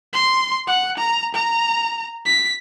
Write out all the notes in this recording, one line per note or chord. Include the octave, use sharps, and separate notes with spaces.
C6
F#5
A#5
A#5
B6